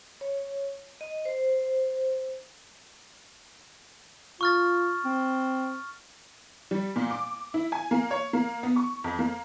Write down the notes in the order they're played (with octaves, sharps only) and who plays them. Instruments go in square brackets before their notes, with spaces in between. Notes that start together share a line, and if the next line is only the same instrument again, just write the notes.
[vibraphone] C#5
D#5
C5
[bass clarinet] F4 [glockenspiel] C#6 F6 A6
[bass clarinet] C4
[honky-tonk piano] G3
A#2
D6
E4
G#5
A#3
C#5
A#3
B3
C#6
F2
A#3